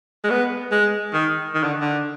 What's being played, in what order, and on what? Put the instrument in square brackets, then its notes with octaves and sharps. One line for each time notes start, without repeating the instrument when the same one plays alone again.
[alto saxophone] G#3
B3
G#3
D#3
D#3
D3
D3